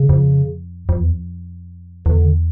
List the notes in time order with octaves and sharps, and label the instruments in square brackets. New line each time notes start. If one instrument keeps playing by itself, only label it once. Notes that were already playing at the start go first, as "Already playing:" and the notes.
Already playing: [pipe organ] C#3
[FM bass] F2
F2
E2
F2
[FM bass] E2 [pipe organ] D3